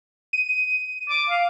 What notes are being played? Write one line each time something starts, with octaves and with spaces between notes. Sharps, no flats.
D#7
D6
F5